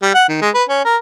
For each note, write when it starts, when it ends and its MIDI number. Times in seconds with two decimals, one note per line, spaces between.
0.02 0.14 55
0.15 0.24 78
0.29 0.39 51
0.42 0.50 56
0.54 0.64 71
0.69 0.82 61
0.85 0.97 70